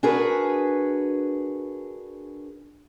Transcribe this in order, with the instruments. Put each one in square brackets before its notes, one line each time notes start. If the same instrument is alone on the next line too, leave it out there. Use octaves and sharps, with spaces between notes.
[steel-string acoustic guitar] D4 F#4 G#4 A#4 B4